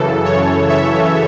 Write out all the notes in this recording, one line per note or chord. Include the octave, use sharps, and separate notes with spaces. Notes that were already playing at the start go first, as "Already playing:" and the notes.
Already playing: F#2 C#3 E3 A4
C#5
E5